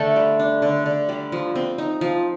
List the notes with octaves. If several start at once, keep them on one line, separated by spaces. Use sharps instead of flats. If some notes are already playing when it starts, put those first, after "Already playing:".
Already playing: D3 A3 A4
G3
D4
D3
D3
G3
F3
C4
D#4
F3